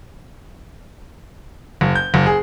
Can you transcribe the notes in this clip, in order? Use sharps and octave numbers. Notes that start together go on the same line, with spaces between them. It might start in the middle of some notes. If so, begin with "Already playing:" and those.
F#1
G6
F#1
G#4